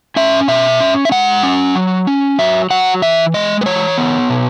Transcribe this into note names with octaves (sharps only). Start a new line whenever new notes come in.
C#4 E5
B2 E5
C#4
E5
G#3 F#5
C#4
F#3
C#4
F#3 E5
F#3 F#5
E3 E5
G#3 D#5
B4
E3 C#5
B3
B2